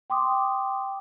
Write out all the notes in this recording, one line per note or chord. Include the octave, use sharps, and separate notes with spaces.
G5 C6 D6 D#6